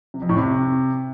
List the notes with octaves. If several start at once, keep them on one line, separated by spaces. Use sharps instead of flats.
C3
F2
A2
C3